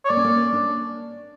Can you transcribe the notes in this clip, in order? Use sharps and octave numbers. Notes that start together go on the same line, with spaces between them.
C#5
A#3 D5
C#4
A#3
C#4
D4